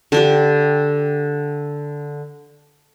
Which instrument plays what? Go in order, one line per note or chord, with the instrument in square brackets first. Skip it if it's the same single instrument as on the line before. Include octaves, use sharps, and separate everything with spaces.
[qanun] D3 D4 G4